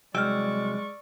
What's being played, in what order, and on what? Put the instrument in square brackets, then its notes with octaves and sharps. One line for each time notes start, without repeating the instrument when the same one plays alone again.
[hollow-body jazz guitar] C2 F#3 G5 [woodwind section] G#3 [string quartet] D5 C#6 [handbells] E6 F6